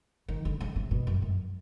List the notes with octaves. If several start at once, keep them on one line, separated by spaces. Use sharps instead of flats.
D#3
D3
C#3
C3
B2
F#2
F#2